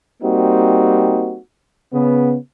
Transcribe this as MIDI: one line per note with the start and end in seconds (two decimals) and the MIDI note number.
0.23 1.37 55
0.23 1.37 58
0.23 1.37 60
0.23 1.37 63
0.23 1.37 66
1.93 2.36 49
1.93 2.36 59